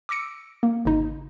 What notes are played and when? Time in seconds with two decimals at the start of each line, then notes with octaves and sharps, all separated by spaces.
0.09 D6 E6 A#6 C#7 D7
0.63 A#3
0.85 G#1 C#3 D#4